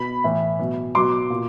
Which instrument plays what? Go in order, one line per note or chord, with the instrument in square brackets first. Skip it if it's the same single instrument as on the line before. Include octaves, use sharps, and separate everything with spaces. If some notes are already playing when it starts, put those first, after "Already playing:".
Already playing: [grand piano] B2 B5
A2 E3
B2 F#3
B2 F#3 C6 D6
A#2